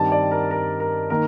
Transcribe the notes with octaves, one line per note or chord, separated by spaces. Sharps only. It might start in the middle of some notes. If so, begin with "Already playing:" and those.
Already playing: G2 D#3 G3 C4 A5
D5
A#4
A#4
A#4
D#3 A#3 A#4